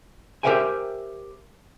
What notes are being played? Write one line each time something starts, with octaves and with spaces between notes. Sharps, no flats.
G4 A#4 C5 E5 G5 G#5